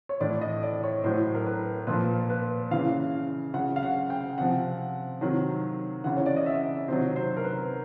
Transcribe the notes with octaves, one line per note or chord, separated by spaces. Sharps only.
C#5
A2 E3 D5
D#5
D5
C#5
A2 F#3 C5
A#4
B4
A#2 F3 B4
B4
C#3 E3 F5
C#3 F#3 F#5
F5
F#5
G5
C3 F3 F#5
C3 D#3 F#3
C#3 E3 F#5
C#5
D5
D#5
E5
C3 D#3 F#3 C5
C5
A#4
B4